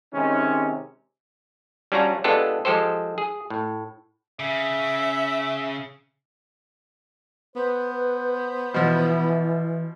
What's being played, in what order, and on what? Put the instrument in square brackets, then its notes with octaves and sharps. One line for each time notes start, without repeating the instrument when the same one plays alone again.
[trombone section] C3 D#3 G#3 C#4
[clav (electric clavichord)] G3 C#4 D4 F4 F#4 A#5
G#3 B3 D4 F4 G4 A4
F3 G#3 G4 A4 C5
G#4
A2
[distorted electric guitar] C#3 [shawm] E5
[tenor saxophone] B3 [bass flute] B4 [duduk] C5
[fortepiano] B2 F3 [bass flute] E3